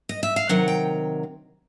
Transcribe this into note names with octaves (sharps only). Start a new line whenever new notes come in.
D#5
E5
F5
C3 D#3 F#3 F#5
G5